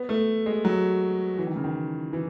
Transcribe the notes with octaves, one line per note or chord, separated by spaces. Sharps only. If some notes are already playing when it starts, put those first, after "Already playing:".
Already playing: B3
A3
G#3
F#3
E3
D#3
C#3
D#3
E3